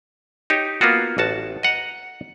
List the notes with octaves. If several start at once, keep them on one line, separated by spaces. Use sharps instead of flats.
D#4 G4 C#5
A#3 B3 F4 F#4
A1 F#4 A5
D#5 F#5 A#5